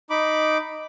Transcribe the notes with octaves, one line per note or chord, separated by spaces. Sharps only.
D#4 B5 D6